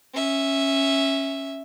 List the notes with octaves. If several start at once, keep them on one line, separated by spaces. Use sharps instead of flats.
C#4 E5